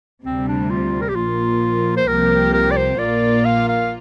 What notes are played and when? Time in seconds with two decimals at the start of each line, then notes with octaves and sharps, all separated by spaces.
0.24 D2 C3 G3 C4
0.48 D4
0.70 F4
1.02 A#4
1.09 G4
1.16 A#1 A#2 F3 A#3 F4
1.97 C5
2.07 C2 C3 F3 A#3 G4 A#4
2.53 A#4
2.71 D5
2.77 C5
2.99 A#1 A#2 A#3 F4 D5
3.45 F5
3.68 F5